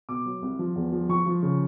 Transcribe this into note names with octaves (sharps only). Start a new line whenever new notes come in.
B2 D6
F#3
C2
F3
E2
F3
F3 C#6
F3
C#3